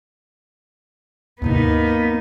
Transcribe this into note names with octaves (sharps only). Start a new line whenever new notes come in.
D#2 G#2 C3 A#3 B3 D#4